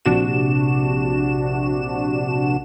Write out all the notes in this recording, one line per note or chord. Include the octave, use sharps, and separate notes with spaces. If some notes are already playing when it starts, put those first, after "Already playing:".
A#1 C3 D4 F#4 E7